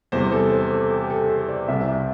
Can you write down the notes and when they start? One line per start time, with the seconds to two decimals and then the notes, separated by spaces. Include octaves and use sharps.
0.12 E2 C3 G3 C5
0.32 A4
0.51 C5
0.71 A4
0.90 G4
1.03 G4
1.10 A4
1.29 C5
1.49 D5
1.68 C2 C3 G3 E5